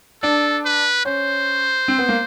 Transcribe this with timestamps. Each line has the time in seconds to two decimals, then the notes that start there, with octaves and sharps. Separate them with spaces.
0.22 D4 A4
0.65 B4
1.05 C#4 C5
1.88 C4
1.98 B3
2.09 A#3